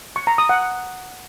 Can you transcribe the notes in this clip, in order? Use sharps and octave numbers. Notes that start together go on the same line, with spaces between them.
C#6
A#5
D#6
F#5